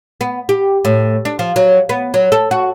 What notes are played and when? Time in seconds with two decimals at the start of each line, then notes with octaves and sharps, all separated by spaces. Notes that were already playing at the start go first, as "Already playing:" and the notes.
0.21 B3
0.49 G4
0.85 A2
1.25 D4
1.39 F3
1.56 F#3
1.89 B3
2.14 F#3
2.32 A4
2.51 F#4